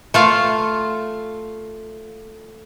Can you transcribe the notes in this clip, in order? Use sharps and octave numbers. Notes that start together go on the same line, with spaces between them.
A3 F4 F5